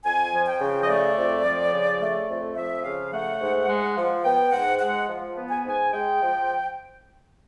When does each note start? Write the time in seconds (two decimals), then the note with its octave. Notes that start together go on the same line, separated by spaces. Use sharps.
0.05 F2 G#5
0.33 F3
0.47 G5
0.60 C#3
0.83 D#5
0.88 A3 D5
1.17 F2
1.45 F3
1.73 C#3
2.01 A3
2.29 F2
2.57 F3 E5
2.84 C#3 F5
3.12 A3 F#5
3.41 G#2
3.68 G#3
3.97 F3
4.25 B3 G5
4.53 G#2 F#5
4.80 G#3 F#5
5.08 F3
5.37 B3
5.50 G#5
5.65 G#2 G#5
5.92 G#3 G5
6.21 F3